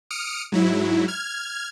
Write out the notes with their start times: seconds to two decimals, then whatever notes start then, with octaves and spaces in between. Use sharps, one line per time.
0.10 D#6 F6 C#7 D7
0.52 G#2 F#3 E4
1.08 F6 G#6